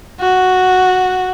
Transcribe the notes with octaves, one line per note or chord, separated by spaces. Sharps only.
F#4